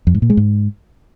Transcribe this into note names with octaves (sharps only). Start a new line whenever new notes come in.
F2
G#2
A#2
G#3
G#2